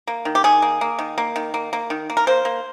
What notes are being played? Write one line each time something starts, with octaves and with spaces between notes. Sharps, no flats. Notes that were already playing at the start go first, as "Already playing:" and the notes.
A#3
D#3
G4
D#3 G#4
A#3
A#3
D#3
A#3
D#3
A#3
A#3
D#3
A#3
A#4
A#3 C5
A#3